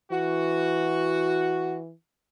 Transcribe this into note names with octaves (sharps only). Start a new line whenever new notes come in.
E3 F#4